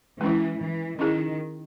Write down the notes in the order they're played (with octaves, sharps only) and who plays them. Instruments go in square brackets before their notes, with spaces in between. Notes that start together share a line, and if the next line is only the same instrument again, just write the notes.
[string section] E3 [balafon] G#3 C#4 E4
[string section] E3
[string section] D#3 [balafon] C#4 E4 G#4